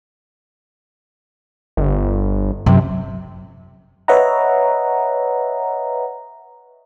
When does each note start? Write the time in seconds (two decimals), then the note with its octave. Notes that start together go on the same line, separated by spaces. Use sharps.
1.77 G1
2.66 F#2 C3
4.08 B4 C#5 D#5 E5 F#5 A#5